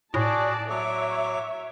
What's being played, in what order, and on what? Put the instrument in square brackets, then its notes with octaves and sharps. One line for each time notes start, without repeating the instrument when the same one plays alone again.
[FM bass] A2 [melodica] F#4 G#4 [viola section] D5 A5
[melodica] F#3 D6 [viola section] C#5 E5